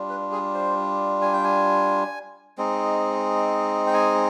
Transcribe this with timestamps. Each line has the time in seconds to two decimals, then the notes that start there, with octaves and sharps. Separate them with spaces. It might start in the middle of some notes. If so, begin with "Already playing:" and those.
Already playing: G3 D4 F4
0.09 B4
0.32 G#4
0.54 C5
1.22 G#5
1.33 G5
1.44 G#5
2.58 G#3 C4 D#4
3.87 G5
3.94 G#5